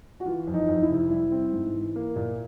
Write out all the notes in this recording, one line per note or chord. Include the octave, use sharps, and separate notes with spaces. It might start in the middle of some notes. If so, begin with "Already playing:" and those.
F#4
E3 F4
F2
D#4
F2
E4
C3
G3 E4
C4
G#2
E3
A#3
A#2